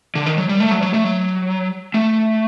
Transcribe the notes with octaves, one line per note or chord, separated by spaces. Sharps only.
D3
D#3
F#3
G3
A3
F#3
F#3
A3
F#3
A3